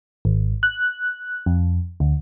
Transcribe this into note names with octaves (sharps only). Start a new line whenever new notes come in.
G#1
F#6
F2
D2